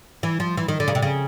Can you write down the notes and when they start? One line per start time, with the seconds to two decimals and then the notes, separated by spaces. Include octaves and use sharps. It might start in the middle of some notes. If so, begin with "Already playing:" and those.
0.23 E3
0.40 F3
0.57 E3
0.68 D#3
0.80 D3
0.88 C#3
0.95 C3
1.02 C#3